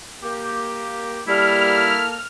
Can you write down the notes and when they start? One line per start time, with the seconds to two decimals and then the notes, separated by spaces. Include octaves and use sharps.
0.22 A#3 G4
1.28 G3 A#3 E4 A4 F6